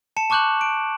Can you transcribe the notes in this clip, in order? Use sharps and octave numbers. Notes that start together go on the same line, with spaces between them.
A5 C#7 E7
A5 C#6 D6 F#6 G6 F#7
D7